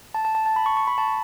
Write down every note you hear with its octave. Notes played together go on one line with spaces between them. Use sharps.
A5
A5
A5
A5
B5
C#6
C#6
B5
A5